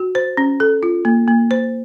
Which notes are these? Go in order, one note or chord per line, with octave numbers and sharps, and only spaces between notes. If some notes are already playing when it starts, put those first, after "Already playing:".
Already playing: F#4
C5
C#4
A4
F4
A#3
A#3
C5